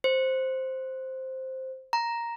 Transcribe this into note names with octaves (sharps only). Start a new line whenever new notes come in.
C5
A#5